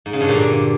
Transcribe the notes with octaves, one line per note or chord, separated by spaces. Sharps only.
G#2
C#3
G2
A#2
D3